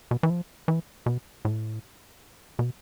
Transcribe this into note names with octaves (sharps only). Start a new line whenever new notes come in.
B2
E3
F3
E3
B2
A2
B2